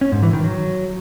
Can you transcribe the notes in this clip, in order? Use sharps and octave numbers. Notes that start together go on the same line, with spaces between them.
C#4
G#2
E3
D#3
F#3